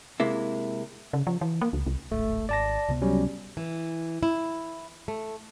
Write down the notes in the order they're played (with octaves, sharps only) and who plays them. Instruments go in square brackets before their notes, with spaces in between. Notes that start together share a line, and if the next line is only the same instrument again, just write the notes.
[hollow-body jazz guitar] C3 G#3 A#3 E4
[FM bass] C#3
F3
E3
A#3
C#2
C2
[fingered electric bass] D1 G#1 [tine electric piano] A3
[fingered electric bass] G#1 [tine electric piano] D5 A5 A#6
[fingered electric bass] C#2 C3 B3
[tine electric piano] F#3 G3 C#4
[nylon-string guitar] E3
E4
A3